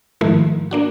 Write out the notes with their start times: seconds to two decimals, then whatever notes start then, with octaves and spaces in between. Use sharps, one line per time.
0.21 G#2 D#3 F3 A3 A#3 E4
0.71 A#3 D4 F#4